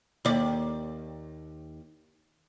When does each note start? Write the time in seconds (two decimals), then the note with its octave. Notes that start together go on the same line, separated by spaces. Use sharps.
0.25 D#2 D5